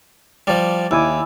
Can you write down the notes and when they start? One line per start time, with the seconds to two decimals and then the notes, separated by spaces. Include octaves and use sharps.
0.47 F3 G3 D5
0.91 D#2 E4 G#5 D6